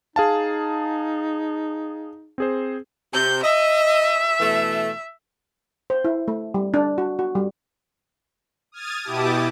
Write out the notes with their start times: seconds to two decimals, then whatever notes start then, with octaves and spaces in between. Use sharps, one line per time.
0.16 D#4 G#4 F5 A5
2.38 C4 G#4 C5
3.13 C3 G6
3.43 D#5 E5
4.40 B2 E3 A3
5.90 C5
6.05 E4
6.28 A3
6.54 G3
6.74 D4
6.98 F#4
7.19 F#4
7.35 G3
8.72 D#6 F6 G#6 A6 D#7
9.03 B2 E4 G4 A5 D6 D#6